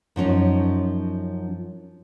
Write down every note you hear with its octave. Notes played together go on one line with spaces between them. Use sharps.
F#2 F3 C#4 D#4